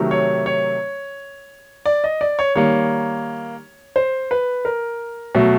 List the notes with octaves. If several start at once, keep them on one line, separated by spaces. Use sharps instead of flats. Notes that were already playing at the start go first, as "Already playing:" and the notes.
Already playing: C3 D#3 F#3 A3
C#5
C#5
D5
D#5
D5
C#5
D#3 G3 A#3 C#5
C5
B4
A#4
B2 F#3 A3